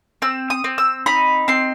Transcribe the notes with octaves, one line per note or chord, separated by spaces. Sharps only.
C4 E6
D#6
C4
E6
D#4 B5
C4 C6